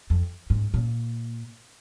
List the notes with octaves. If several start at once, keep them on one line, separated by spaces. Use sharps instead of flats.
F2
G#2
A#2